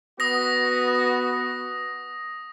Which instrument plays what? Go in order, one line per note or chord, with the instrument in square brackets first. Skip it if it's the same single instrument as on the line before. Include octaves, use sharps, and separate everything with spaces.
[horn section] B3 F#4 [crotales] D#6 A#6